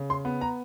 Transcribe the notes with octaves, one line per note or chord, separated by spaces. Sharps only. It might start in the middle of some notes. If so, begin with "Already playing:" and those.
Already playing: C#3
C6
B3
A#5